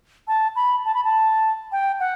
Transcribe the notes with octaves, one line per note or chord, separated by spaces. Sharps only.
A5
B5
A5
B5
A5
G5
F#5